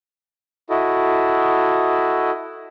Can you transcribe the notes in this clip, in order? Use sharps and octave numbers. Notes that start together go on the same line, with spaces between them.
E4 F#4 A4 D#5